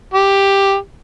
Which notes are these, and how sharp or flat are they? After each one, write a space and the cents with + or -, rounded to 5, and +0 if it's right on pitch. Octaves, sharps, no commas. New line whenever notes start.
G4 +5